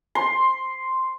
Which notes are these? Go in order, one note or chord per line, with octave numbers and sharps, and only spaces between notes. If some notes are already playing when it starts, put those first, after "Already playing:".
C6